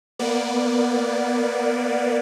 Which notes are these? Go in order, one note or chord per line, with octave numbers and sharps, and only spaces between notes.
A#3 B3 D5